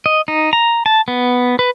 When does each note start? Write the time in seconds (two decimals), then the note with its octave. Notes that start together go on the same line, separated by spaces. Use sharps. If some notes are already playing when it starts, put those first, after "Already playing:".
0.06 D#5
0.28 D#4
0.53 A#5
0.86 A5
1.08 B3
1.59 B4